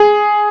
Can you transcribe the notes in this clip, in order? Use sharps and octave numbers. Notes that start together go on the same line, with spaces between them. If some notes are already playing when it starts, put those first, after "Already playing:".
Already playing: G#4